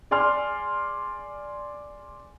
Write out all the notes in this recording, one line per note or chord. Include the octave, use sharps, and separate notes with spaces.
G#4 D5 G#5 C6 F6